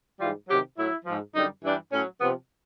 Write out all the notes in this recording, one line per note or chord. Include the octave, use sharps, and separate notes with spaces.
G#2 E3 G3 F4
C3 D#3 F#3 G4
A2 F#3 E4
G#2 F3
F#2 D3 G3 D#4
G2 E3 G3 D4
A2 F#3 C#4
C3 F3 B3